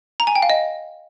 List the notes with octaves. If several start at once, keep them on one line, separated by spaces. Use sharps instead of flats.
A#5
G#5
G5
F5
D#5